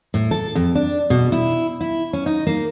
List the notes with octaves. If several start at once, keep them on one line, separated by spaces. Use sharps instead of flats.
A2
A4
F2
D4
B2
E4
E4
C#4
D#4
A#3